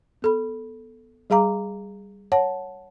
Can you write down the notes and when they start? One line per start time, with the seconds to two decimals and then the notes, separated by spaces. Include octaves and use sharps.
0.22 B3 A4 B5
1.30 G3 G#4 F5 A#5 D6
2.32 C#5 F#5 A5